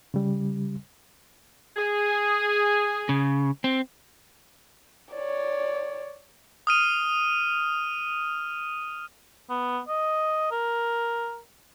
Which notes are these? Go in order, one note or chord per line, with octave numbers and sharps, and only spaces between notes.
C#3 G3
G#4
C#3
C4
C#5 D5
D#6 F6 D#7
B3
D#5
A#4